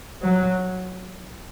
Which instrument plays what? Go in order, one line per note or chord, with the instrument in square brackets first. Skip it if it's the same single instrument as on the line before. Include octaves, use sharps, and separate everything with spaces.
[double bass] F#3